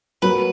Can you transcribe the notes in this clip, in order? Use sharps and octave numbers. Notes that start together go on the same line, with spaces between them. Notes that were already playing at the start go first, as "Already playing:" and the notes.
F#3 A#3 B4